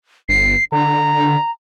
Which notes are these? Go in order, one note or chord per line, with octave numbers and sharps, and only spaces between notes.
G1 C7
D3 A#5